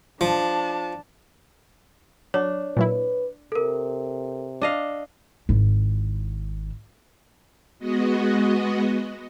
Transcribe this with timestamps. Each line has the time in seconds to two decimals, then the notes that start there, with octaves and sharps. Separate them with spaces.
0.21 F3 D4 A5
2.34 F#3 D4 C#5
2.77 A#2 F#3 E4 B4
3.52 C3 A4 A#4
4.62 D4 D#5 F5
5.49 G#1 E4
7.79 G#3 B3 F#4 D#5